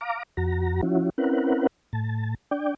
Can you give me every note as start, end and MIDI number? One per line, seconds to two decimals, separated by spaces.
0.01 0.23 77
0.01 0.23 82
0.01 0.23 86
0.37 0.81 41
0.37 0.81 66
0.37 0.81 82
0.83 1.10 53
0.83 1.10 61
0.83 1.10 64
0.83 1.10 66
1.18 1.67 60
1.18 1.67 61
1.18 1.67 64
1.18 1.67 70
1.18 1.67 71
1.18 1.67 78
1.93 2.35 45
1.93 2.35 81
2.51 2.74 62
2.51 2.74 74
2.51 2.74 79